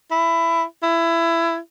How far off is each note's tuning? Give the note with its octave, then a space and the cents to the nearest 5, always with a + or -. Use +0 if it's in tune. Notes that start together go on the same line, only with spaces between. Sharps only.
E4 +15
E4 +20